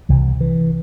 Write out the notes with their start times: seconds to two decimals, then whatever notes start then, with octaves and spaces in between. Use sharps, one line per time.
0.09 C2 C3 E3
0.41 E3